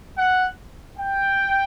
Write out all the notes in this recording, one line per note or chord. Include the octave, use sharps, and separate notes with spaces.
F#5
G5